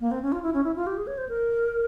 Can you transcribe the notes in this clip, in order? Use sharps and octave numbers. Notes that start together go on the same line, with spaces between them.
A#3
C4
C#4
F4
E4
C#4
E4
F4
G4
G#4
C#5
C5
A#4